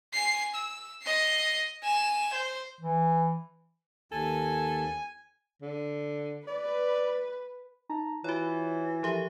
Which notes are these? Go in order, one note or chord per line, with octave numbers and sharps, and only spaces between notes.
G#5 C7
E6
D#5 C7
G#5 E7
C5
E3
D#2 A4 G#5
D3
B4 D5
D#4 A5 A#5
E3 F4 F#4 C#5
F3 G4 A4 E5